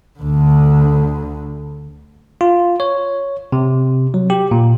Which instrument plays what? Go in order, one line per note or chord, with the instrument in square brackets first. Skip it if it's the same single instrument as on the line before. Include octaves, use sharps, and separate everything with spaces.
[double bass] D2 D3
[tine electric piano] F4
C#5
C3
F#3
G4
A#2